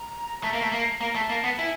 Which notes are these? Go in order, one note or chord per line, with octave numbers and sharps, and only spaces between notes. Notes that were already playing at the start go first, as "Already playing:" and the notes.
Already playing: A#5
A3 A#5
A#3
A3
A#3
A#3 A#5
A3 A#5
A5
A#3
B3
E4 G#5